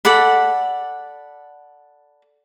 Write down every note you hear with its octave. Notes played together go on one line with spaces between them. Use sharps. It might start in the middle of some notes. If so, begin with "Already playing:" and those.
A4 D5 F#5 B5